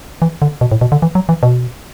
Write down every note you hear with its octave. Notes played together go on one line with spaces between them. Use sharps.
E3
D3
B2
A2
B2
D3
E3
F#3
E3
B2